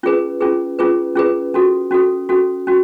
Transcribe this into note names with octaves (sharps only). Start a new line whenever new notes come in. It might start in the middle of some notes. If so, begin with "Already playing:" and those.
C#4 F4 G#4 B4
C#4 F4 G#4 B4
C#4 F4 G#4 B4
C#4 F4 G#4 B4
C#4 F#4 A4
C#4 F#4 A4
C#4 F#4 A4
C#4 F#4